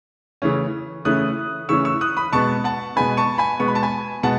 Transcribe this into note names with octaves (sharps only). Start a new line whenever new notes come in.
C#3 E3 A3 C#4
C#3 E3 A3 C#4 D#6 F#6
C#3 E3 A3 C#4 C#6 E6
C#6 E6
D#6 F#6
B5 D#6
B2 G#3 B3 A5 C#6
F#5 A5
B2 G#3 B3 G#5 B5
A5 C#6
G#5 B5
B2 G#3 B3 C#6
B5
A5
G#5 B5
B2 G#3 B3 F#5 A5